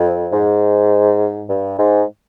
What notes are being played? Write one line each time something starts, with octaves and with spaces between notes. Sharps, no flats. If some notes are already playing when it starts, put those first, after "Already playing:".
Already playing: F2
G#2
G2
G#2